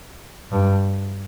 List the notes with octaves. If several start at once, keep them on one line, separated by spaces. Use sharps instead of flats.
G2